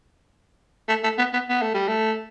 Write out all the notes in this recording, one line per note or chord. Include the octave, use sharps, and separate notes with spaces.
A3
A3
B3
B3
B3
A3
G3
A3